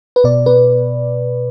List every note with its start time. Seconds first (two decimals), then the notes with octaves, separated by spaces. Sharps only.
0.16 B4
0.24 B2 D5
0.46 B2 B4